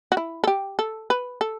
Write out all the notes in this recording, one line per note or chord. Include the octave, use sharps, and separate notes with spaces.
F#4
E4
A4
G4
A4
B4
A4